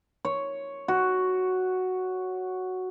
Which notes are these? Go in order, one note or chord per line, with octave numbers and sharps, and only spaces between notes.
C#5
F#4